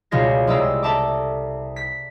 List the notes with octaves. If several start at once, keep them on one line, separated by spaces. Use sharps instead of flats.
C#2 B2 G3 F4 C#5 A#6
C2 G#3 D5 A#5 E6
A4 D5 E5 A5 A#5 D6
B6